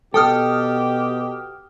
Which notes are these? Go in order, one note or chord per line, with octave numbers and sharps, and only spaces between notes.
B2 G4 A4 G5 D#6 F6